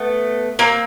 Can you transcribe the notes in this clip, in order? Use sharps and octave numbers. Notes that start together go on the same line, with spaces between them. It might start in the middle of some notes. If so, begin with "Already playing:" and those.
Already playing: A3 B3
A#3 C4